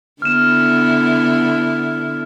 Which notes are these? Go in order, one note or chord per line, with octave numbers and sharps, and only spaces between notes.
D3 B3 E4 F6 E7